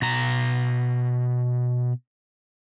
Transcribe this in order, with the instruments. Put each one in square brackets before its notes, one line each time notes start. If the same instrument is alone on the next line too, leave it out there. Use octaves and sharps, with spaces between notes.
[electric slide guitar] B2 A#5